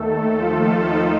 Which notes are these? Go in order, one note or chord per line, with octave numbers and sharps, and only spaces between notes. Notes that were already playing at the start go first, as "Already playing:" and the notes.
Already playing: D#2 D#3 A3 A4
F3 F4
D#4